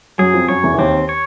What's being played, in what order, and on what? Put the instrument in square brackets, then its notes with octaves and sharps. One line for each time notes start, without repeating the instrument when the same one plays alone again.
[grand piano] F#2 F#3 [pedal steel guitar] G#4
[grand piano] F2 F3
[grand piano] F#2 F#3 [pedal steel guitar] C#5
[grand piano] E2 E3
E3
[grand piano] D#2 D#3 [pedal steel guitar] C4
[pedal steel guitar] C#5